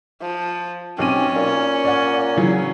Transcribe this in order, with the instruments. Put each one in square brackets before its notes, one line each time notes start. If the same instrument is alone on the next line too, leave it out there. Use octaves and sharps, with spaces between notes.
[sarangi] F3
[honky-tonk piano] B1 C4 D#7 [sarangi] C#4 [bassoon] G4
[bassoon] A#2
[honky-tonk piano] D5 F#5
C#3 E3 F#3